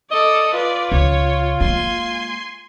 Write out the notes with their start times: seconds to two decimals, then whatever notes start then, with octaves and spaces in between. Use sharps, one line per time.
0.11 A4 D5 D#5
0.53 F4 B4 D5
0.92 C#2 C#5
1.61 G#3 A#3 G#5 C6